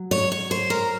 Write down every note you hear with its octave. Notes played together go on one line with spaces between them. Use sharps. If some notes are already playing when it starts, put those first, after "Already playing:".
Already playing: F#3
C#5
C#5
C5
A#4